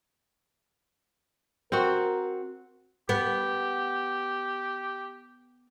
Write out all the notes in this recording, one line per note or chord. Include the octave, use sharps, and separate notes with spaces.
C4 F#4 A#4
B3 G4